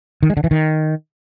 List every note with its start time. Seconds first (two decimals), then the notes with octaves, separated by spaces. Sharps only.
0.23 D#3
0.30 G#3
0.37 D3
0.44 E3
0.51 D#3